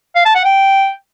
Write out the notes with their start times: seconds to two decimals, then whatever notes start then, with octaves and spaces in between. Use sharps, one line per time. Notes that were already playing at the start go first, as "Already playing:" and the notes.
0.15 F5
0.25 A5
0.35 F#5
0.45 G5